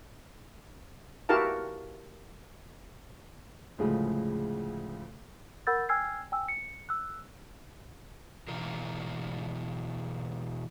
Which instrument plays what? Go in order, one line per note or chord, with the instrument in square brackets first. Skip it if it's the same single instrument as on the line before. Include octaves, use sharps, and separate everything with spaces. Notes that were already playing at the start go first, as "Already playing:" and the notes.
[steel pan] E4 F#4 G4 A#4 F5 A5
[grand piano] D2 A2 C#3 F3 G#3
[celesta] A#4 F#5 B5 E6 G6 A6
G5 G#5 E6 F6 G#6 C7
G5 G#5 E6
C#7
E6 F#6
[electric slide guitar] B2 E3 F4 A#4